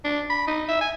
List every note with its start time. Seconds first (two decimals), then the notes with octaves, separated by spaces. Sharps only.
0.04 D4
0.30 B5
0.47 D#4
0.68 E5
0.81 G#5